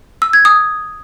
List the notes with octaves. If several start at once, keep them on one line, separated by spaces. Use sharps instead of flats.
E6
G#6
D#6